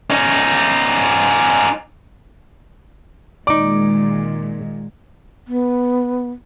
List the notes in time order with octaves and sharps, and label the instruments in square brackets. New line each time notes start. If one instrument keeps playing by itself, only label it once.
[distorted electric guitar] C#4 D#4
[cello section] A#2 D#3 G#3 [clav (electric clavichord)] D#4 D5 [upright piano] D6
[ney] B3